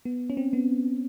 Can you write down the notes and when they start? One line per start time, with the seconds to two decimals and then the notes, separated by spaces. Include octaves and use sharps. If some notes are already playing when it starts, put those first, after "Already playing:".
0.05 B3
0.30 C#4
0.37 C4
0.53 B3